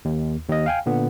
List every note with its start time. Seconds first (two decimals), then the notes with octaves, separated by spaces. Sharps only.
0.05 D#2
0.48 D#2 D#5
0.66 F5 G5 G#5
0.86 A#2 D3 B3